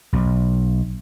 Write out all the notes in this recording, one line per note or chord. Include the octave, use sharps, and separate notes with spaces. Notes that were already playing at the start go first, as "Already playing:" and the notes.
B1